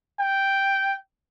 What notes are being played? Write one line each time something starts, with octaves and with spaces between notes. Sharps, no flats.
G5